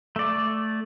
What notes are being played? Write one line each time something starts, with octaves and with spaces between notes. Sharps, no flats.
A3 D5